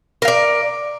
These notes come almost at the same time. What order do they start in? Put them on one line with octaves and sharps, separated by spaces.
A#4 F5 D5